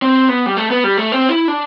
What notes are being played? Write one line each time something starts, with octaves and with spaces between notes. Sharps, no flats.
C4
B3
G3
A3
B3
G3
A3
C4
E4
D4